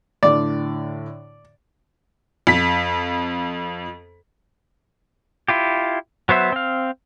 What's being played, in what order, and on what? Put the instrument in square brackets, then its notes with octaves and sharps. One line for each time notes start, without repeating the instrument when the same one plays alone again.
[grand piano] A2 D3 [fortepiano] D5
[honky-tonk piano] F2 B6
[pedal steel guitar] E4 F4 G4
F#3 B3 C5 E5
C4 F5